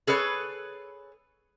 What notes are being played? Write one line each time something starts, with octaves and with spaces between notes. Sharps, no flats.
G#4 A4 B4 C#5